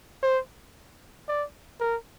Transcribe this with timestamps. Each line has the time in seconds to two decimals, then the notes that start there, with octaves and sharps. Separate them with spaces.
0.23 C5
1.28 D5
1.80 A#4